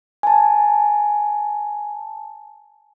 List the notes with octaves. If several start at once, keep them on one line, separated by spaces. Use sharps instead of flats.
G#5 A5